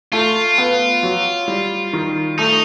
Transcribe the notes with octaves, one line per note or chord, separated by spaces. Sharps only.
A3 F4
B3
F#3
G3
D#3
A3 D#4